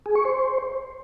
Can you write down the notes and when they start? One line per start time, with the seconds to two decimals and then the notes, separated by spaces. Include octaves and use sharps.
0.06 G#4
0.15 C#6
0.25 C5